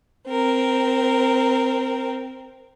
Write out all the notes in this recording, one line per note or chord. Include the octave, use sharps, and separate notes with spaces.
C4 A#4